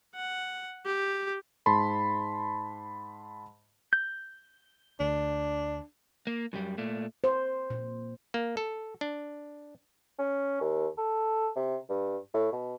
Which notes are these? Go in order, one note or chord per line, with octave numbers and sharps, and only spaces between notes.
F#5
G4
G#2 A5 B5 C6
G6
D2 D4
A#3
F#2 G3
A#2 A3
C5
A#2
A#3
A4
D4
C#4
D#2
A4
C3
G2
A2
B2